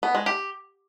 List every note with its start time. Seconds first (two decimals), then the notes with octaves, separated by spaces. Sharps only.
0.03 B3
0.15 G#3
0.26 G4